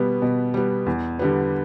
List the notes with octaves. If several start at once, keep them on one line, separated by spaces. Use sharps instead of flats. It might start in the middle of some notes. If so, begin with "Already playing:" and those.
Already playing: B2 G3 B3
B2
G3 B3
E2
D3 G3 B3